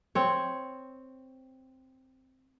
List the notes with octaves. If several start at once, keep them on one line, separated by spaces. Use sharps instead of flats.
C4 C#5